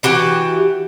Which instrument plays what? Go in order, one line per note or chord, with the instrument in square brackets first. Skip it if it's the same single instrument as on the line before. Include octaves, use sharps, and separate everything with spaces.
[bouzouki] E3 F#4 G4 F#5